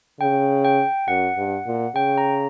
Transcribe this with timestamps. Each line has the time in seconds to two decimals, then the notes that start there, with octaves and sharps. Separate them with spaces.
0.20 C#3 G5
0.64 G5
1.08 F#2 F#5
1.37 G2
1.66 A#2
1.95 C#3 G5
2.18 A#5